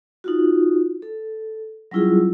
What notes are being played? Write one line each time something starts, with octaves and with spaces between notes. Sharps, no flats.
D#4 F4 F#4
A4
F#3 G3 C#4 E4 F4 G#4